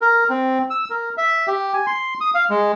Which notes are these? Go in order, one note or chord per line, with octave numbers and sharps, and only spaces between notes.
A#4
C4
E6
A#4
E5
G4
G#5
C6
D#6
F5
G#3